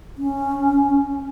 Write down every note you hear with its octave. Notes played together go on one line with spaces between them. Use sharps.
C#4